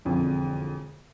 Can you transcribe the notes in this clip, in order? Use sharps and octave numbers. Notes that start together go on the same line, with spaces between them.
E1 F2 D3